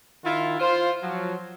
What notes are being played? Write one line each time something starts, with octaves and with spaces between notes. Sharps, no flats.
D#3 E4 F4
F4 C5
F3 F#3